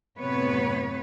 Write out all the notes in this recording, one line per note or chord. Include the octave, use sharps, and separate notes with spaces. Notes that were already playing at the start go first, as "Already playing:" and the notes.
F#2 A2 C3 B3 B4 C#5